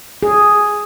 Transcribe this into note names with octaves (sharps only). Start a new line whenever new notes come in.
G#4